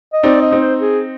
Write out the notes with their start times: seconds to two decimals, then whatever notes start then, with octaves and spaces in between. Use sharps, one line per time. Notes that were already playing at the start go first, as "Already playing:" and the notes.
0.13 D#5
0.23 C4 D#4 D5
0.42 D#5
0.51 C4 D#4
0.61 C5
0.81 G#4